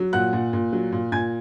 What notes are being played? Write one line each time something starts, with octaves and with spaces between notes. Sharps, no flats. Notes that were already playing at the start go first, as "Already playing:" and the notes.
Already playing: F#3
A#2 F#5 F#6
A#2
A#2
F#3
A#2
A#2 G#5 G#6